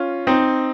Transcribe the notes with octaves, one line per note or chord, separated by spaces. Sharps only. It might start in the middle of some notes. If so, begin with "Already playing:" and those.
Already playing: C#4 F4
C4 D#4